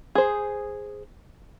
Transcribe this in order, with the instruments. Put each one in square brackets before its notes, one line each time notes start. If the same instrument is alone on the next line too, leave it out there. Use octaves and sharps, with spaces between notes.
[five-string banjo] G#4 C5